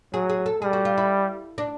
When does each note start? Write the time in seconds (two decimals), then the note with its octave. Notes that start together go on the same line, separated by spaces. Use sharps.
0.13 F#3 G#4
0.29 G#4
0.46 A4
0.62 G3 G#4
0.73 F#4
0.85 F4
0.98 E4
1.58 D4